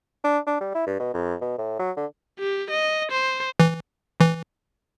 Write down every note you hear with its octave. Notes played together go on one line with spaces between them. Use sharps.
D4
D4
G3
E4
G2
B2
F2
B2
A2
F#3
D3
G4
D#5
C5
E3
E3